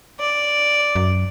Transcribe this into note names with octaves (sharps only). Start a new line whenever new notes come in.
D5
F#2